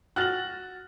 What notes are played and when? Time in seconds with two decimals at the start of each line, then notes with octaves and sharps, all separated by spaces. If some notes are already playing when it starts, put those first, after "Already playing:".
0.16 F#4 F6 F#6 A6 A#6 F#7